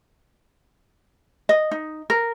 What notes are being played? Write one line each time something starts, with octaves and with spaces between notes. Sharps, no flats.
D#5
D#4
A#4